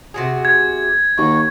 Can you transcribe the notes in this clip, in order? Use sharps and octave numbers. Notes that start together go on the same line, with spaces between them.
C3 F#4 G#4
G#6
D#2 F#4 C#6